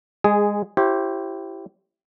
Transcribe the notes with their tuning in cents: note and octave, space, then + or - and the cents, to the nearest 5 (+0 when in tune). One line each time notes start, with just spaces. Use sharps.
G#3 -20 G#4 +0
E4 +20 G4 -15 C5 +35